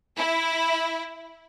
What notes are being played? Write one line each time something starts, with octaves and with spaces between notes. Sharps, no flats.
E4